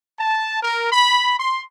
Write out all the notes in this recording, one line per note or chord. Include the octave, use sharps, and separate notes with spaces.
A5
A#4
B5
C6